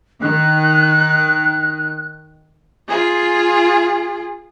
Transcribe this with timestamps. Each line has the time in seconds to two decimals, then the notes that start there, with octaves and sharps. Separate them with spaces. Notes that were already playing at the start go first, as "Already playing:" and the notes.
0.22 D#3 F#6
2.88 F4 G#4